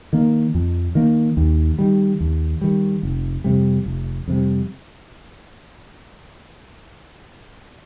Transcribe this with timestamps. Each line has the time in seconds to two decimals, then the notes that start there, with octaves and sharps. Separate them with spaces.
0.13 D#3 A#3
0.54 F2
0.95 D#3 A#3
1.37 D#2
1.79 D#3 G3
2.20 D#2
2.61 D#3 G3
3.03 F1
3.44 F2 C3 G3
3.86 F1
4.28 F2 C3 G3